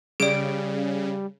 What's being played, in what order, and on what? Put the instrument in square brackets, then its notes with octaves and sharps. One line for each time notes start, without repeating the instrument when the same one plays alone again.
[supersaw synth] C#3 [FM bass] G3 [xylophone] G#4 D5 [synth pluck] D7